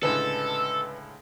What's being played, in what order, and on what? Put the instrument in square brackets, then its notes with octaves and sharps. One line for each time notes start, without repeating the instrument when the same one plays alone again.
[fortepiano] C#2 A2 D3 [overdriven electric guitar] A4 [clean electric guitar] B4 D#5 G#5